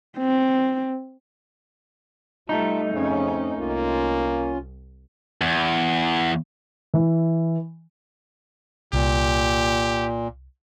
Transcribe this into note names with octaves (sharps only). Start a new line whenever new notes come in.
C4
G3 A3 D#4 F4 E5 A5
F2 C#3 C4 C#4
C2 A#3 C#4 F4
E2
E3
C2 A#2 G4